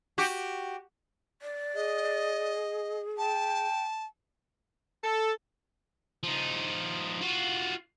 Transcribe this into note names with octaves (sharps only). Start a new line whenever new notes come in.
F#4 G4
D5
G#4 D#5
G5 A5
A4
F3 D#4
F4 F#4